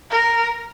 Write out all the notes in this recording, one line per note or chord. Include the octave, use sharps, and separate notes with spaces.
A#4